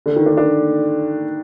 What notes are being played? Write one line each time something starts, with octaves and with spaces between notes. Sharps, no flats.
D3
D#3
D4
D4